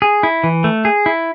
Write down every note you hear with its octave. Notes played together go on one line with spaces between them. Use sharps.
G#4
E4
E3
A3
G#4
E4